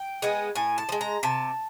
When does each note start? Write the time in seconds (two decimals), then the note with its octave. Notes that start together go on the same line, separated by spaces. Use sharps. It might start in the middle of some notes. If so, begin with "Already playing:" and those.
Already playing: G5
0.22 G#3 B3
0.55 A2 G#5
0.78 A5
0.89 F3
0.92 G#3
1.01 A#5
1.23 C3 A5